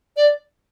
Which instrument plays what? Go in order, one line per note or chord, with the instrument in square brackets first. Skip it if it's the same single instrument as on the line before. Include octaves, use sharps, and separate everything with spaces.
[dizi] D5